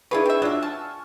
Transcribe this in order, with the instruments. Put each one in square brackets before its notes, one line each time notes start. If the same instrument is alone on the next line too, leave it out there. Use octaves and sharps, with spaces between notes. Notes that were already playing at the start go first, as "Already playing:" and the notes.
[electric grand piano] D4 G#4 C#6 [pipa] E4 F4 B4
[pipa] C4 E5
[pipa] F#3 E5 [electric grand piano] D4 F4 F6
[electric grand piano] G#5 C#6 F6 [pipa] A5